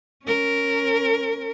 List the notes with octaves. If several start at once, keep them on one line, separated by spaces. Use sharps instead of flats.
C#4 A#4